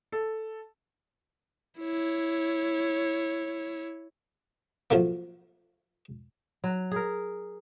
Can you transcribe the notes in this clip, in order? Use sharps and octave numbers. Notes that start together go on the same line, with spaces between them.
A4
E4 C#5
F3 F#3 A3 A#3
F#3
G#4 A#4